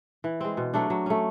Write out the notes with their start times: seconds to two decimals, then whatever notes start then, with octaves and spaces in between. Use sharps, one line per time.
0.24 E3
0.41 G#3 C4
0.57 B2
0.74 F#3 A3 D4
0.90 F#3
1.06 A3 C#4